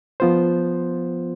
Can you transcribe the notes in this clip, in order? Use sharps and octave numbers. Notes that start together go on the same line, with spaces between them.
F3 B3 F4 C5